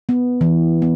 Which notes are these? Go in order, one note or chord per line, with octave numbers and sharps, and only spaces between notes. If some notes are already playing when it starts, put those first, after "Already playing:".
B3
E3
B3